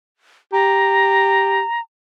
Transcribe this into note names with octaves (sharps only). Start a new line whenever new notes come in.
G4 A#5